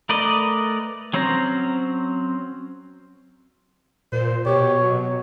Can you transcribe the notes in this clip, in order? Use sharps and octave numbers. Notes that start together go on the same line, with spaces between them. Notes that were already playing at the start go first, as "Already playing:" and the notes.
A3 A#4 B4 D5 D#5
F#3 C4 C#4 C5 A#5
A#2 C5
B2 G4 C#5
F#3